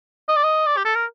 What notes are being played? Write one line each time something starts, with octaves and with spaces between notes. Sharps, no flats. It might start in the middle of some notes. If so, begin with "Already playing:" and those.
D#5
D5
D#5
D5
G4
A4
A#4